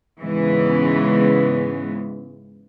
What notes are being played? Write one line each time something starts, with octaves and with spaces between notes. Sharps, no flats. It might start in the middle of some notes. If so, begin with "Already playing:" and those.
G#2 C#3 E3 G#3 B3